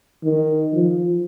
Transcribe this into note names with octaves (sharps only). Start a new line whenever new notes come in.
D#3
F3